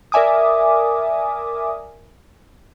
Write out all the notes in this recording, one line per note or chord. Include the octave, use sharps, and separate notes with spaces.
A#4 D5 E5 G#5 D6 D#6